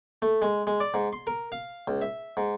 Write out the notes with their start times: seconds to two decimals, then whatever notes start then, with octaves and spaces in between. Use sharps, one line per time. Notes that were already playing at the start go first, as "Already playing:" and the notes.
0.22 A3
0.42 G#3
0.67 G#3
0.80 D5
0.94 G#2
1.13 C6
1.27 A#4
1.52 F5
1.88 C#2
2.02 E5
2.37 G#2